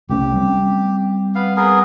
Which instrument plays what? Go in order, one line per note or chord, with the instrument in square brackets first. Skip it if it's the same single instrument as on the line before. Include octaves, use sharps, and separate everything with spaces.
[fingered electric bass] C2 A3 C#4 [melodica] G4
[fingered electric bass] G3 G#3 C4
[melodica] B3 F5
B3 G#4 A#4